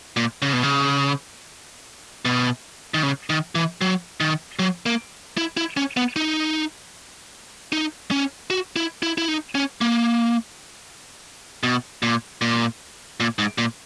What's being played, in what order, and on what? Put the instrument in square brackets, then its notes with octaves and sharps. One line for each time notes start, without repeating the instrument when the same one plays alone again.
[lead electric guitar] A#2
C#3
B2
C#3
B2
D#3
C#3
D#3
E3
F#3
D#3
F#3
A#3
E4
E4
C#4
B3
D#4
D#4
C#4
F#4
E4
E4
E4
D#4
C#4
A#3
B2
A#2
A#2
A#2
G#2
A#2